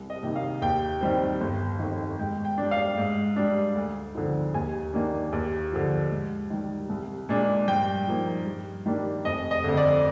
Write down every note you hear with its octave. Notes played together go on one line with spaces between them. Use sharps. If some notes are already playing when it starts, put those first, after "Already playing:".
Already playing: C2
D#5
C3 D#3 A#3 D#4
F5
D#2 G5
D#3 G3 C4
G1
F2 D#3
G#2 G5
G5
G3 D4
F5
G#2
G3 D4
D2
D3 F3 C4 D#4
D#2 G#5
D#3 A#3 D4
D#2
D3 F3
G#2
D#3 G3
C2
A#2 G#3 D4
G2 G5
F3 A#3 D#4
G2
D#3 G3 A#3 D4
F1 D#5
D#5
F2 D3
D5